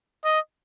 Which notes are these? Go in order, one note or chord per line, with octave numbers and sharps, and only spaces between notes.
D#5